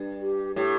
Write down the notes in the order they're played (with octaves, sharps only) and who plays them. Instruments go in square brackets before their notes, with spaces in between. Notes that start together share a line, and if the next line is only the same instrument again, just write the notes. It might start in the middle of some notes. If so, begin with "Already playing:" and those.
Already playing: [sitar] G2
[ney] G4
[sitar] A2 [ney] G4